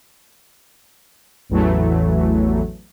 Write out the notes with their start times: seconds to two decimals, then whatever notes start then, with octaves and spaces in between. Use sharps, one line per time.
1.49 A1 E2 E3 F#3 A3